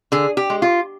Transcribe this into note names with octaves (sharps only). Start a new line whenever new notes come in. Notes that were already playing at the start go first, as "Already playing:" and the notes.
D3 G#4
G4
G#3
F4